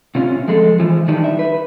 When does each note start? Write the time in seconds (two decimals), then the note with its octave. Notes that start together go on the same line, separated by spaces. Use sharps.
0.15 C3 C#4 F4
0.48 F3 G#3 A4
0.80 E3 F3
1.08 D#3 E3 G3 D4 D#4
1.24 E5
1.39 B4